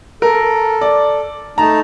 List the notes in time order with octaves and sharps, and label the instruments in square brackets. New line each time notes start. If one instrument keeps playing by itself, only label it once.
[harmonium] A4 [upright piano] A#4
[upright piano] D5
[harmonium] A3 D#4 A5 [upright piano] A#5